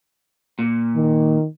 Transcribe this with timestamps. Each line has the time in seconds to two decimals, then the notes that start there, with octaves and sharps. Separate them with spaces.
0.59 A#2
0.96 D#3